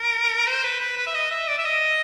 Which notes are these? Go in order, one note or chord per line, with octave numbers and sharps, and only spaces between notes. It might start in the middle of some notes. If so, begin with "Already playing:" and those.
Already playing: A#4
C5
B4
B4
B4
E5
D#5
E5
D5
E5
D#5